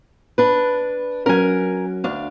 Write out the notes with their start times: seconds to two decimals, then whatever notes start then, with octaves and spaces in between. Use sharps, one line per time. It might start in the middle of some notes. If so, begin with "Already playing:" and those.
0.38 D4 B4
1.26 F#3 C#4 A#4 G#5
2.04 D2 D4 F5